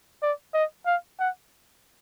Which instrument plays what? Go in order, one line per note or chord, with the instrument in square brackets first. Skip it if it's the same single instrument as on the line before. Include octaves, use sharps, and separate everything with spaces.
[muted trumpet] D5
D#5
F5
F#5